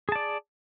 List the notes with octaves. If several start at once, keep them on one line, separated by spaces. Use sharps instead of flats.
G#4 D5 A5